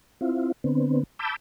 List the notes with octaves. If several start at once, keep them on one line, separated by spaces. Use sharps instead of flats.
C4 E4 F4
D3 B3 C4
A5 B5 D6 E6 G6